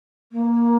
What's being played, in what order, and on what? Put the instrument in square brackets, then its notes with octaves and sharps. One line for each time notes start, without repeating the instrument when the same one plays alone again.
[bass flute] A#3